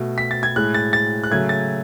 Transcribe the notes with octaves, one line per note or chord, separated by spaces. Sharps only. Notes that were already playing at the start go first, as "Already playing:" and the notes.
Already playing: B2 A3
B6
A6
G#6
A2 G#3 F#6
A6
A6
F#6
C#3 F#3 A3 G#6
A6